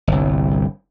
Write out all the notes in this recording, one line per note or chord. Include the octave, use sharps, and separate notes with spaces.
G1 C2